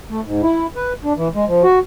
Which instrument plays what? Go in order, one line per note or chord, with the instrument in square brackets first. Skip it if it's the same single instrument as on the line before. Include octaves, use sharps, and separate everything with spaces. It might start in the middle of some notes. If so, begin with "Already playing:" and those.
[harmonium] A3
G#2
E4
B4
D4
E3
G#3
F3
F#4